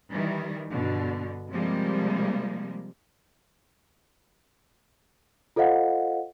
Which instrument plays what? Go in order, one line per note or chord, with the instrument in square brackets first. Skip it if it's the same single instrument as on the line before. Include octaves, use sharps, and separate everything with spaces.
[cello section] D#3 E3 G3
G2 B2 D3
C3 F3 G3 G#3 A#3
[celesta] F4 A4 C5 D#5 F5 F#5